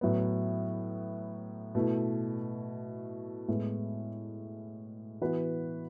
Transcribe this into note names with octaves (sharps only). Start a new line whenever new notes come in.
A2 F#3 B3
B2 A3 E4
A2 G#3 B3
E3 B3 F#4 B4